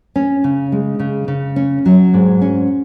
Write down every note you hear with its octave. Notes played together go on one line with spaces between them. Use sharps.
C#4
C#3
G#3
C#3
C#3
C#4
F#3
G#2
C#4